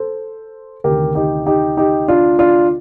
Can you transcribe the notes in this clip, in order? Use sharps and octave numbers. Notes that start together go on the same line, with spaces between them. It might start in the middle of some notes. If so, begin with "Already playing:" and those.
Already playing: A4 C5
D2 C3 D#3 G4 A#4
D#4 G4
D#4 G4
D#4 G4
D4 F4
D4 F4